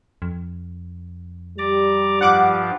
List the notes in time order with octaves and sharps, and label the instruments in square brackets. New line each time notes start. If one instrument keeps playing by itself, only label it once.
[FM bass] F2
[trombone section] G3 [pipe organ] D5 A#5 D6
[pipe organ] G2 F3 F4 [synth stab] F#5 D6